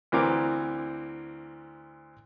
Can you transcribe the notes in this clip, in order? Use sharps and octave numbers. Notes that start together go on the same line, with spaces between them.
D2 E3 C4 A#4 D6